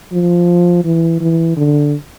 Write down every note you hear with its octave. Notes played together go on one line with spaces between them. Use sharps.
F3
E3
E3
D3